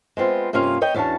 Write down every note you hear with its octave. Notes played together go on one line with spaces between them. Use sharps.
G#3 B3 C4 F4
G2 C3 A#3 C#4 F4 F5
B3 C#5 D#5 G5
E2 C#4 D4 F#4 A5